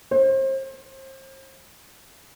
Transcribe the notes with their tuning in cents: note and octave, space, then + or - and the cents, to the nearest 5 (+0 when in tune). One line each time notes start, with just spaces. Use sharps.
C5 +35